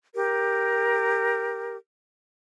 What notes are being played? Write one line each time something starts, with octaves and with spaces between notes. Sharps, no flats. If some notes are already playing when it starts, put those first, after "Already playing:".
G4 A#4